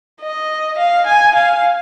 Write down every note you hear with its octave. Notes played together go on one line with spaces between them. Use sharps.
D#5
F5
G#5
F5